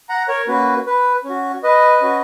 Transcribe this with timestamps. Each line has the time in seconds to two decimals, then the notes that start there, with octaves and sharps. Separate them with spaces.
0.09 F#5 A#5
0.28 A#4 C#5
0.48 A#3 C#4 F#4 B4
0.86 B4
1.24 C#4
1.29 F#4
1.63 B4 D#5
2.01 C#4 F#4